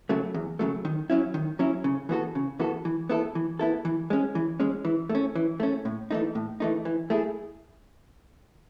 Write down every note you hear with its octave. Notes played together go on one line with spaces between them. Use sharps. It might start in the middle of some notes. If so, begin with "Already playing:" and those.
C#3 F#3 A3
E2
C#3 F#3 A3
D#3
F#3 C#4 E4
D#3
F#3 C#4 E4
C#3
E3 B3 F#4 A4
C#3
E3 B3 F#4 A4
E3
B3 E4 A4
E3
B3 E4 A4
E3
G#3 C#4
E3
G#3 C#4
E3
A3
C#4
E3
A3 C#4
A2
E3 A3 D#4
A2
E3 A3 D#4
E3
A3 E4 G#4